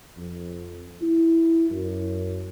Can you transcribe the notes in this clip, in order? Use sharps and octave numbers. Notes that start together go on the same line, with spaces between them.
F2
E4
F#2